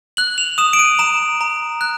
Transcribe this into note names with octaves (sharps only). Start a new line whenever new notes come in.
F#6 F#7
F7
D#6 E7
D7
D#7
A#5 E7
A#5
F#6